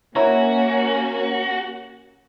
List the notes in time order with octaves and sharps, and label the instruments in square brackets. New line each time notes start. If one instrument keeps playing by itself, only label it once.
[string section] A#3 C#4 [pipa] E4 C#5 [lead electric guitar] F#4 [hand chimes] A#5